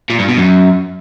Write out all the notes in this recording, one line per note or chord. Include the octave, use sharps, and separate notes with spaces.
A#2
G2
B2
F#2